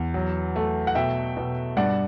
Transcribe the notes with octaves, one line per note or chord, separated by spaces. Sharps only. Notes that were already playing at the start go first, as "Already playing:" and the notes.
Already playing: E2
F#3
A3
F#5
B2 E5 G5
B2
G2 D5 F#5